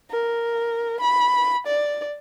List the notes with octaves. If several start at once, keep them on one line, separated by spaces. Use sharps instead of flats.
A#4
B5
D5